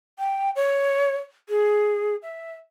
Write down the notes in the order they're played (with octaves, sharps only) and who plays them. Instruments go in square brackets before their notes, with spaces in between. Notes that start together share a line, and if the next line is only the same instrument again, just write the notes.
[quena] G5
C#5
G#4
E5